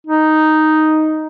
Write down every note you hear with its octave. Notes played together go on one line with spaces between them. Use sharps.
D#4